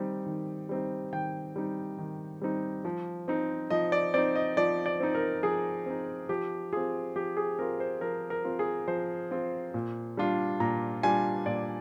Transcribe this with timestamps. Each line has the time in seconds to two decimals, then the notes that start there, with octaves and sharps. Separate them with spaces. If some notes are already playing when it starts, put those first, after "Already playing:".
Already playing: D#3 G3 C4 D#4
0.26 D#3
0.69 G3 C4 D#4
1.13 D#3 G5
1.56 G3 C4 D#4
1.99 D#3
2.42 G3 C4 D#4
2.85 F3
3.28 C4 D#4
3.71 F3 D#5
3.92 D5
4.14 C4 D#4 D5
4.36 D#5
4.57 F3 D5
4.86 D5
5.00 C4 D#4
5.15 A#4
5.43 F3 G#4
5.86 C4 D#4
6.29 F3 G4
6.72 C4 F4 G#4
7.16 F3 G4
7.37 G#4
7.59 C4 F4 A#4
7.80 C5
8.01 F3 A#4
8.30 A#4
8.45 C4 F4
8.59 G#4
8.88 F3 C5
9.31 C4 F4
9.74 A#2
10.17 G3 D4 F4
10.60 A#2 A#5
11.03 G3 D4 F4 G#5
11.46 A#2 D5